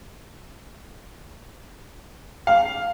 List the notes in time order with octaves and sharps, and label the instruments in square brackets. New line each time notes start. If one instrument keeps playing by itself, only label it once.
[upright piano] F5